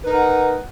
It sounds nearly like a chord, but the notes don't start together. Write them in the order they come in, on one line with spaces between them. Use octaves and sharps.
B4 D#4 A#4 F#5